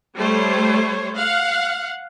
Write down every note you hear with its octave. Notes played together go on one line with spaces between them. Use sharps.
G3 A3 C5 C#5
F5 F#5